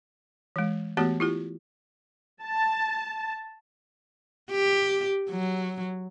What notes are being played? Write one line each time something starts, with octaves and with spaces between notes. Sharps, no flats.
E3 G#3
E3 A3 B3 F#4 G4 A5
E4 F4 G4
A5
G4
F#3